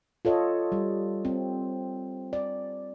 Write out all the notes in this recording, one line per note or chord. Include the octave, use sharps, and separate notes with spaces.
F4 A4 C#5 D#5
G3
C4
D5